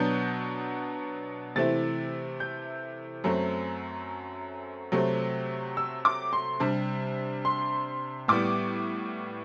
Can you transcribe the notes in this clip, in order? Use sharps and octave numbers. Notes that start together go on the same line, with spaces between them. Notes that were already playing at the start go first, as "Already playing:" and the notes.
Already playing: B2 F#3 B3 D4 G6
C3 E3 A3 C4 E4 A6
G6
F#2 F#3 A3 C4
C3 F#3 A3 C4
E6
D6
C6
C3 G3 D4
C6
A2 G3 B3 D6